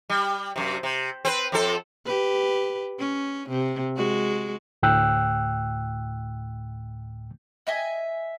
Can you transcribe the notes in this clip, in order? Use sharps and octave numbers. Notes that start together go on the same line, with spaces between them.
G3
F#2 C3
C3
C4 B4
F2 C4 A4
G4 B4
C#4
C3
G#3 F#4
D2 A2 G5 E6 F#6
D#5 E5 G#5